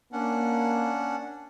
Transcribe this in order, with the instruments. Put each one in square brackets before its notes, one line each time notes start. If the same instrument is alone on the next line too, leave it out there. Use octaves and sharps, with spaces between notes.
[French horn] A#3 [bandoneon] C#4 D4 F#5